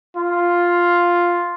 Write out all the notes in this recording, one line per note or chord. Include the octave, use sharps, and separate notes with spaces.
F4